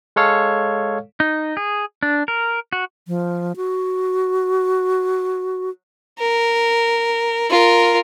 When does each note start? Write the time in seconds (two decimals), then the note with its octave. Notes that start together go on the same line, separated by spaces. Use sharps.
0.16 G#3 A4 C#5 F5
1.20 D#4
1.57 G#4
2.03 D4
2.28 A#4
2.73 F#4
3.08 F3
3.56 F#4
6.19 A#4
7.50 F4 A#4